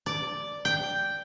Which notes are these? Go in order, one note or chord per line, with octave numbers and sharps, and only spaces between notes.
D5
G5